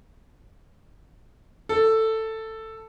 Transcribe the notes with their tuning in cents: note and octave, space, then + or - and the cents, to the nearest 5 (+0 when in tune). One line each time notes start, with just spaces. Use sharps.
A4 +10